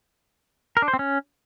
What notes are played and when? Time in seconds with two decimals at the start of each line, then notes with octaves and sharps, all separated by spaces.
0.77 A#4
0.82 D4
0.88 C5
0.94 C4
0.99 C#4